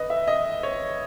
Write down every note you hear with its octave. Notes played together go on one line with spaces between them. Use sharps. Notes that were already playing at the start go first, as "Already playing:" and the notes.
Already playing: B4 D#5
E5
D#5
C#5